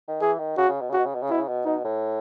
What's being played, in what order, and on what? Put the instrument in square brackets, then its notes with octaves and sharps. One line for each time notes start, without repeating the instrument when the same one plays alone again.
[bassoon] D#3
[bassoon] E3 [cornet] G#4
[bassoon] D#3
[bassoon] C#3 [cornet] F#4
[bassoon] C#3
B2
[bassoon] C#3 [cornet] F#4
[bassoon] B2
C#3
B2
C#3
[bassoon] B2 [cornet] E4
[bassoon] C#3
B2
[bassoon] B2 [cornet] D#4
[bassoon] A2